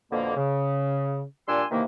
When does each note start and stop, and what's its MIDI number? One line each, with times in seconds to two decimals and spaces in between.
0.12 0.34 41
0.12 0.34 47
0.12 0.34 50
0.12 0.34 58
0.36 1.22 49
1.48 1.64 46
1.48 1.64 55
1.48 1.64 62
1.48 1.64 80
1.48 1.64 84
1.48 1.64 88
1.71 1.83 48
1.71 1.83 51
1.71 1.83 52
1.71 1.83 58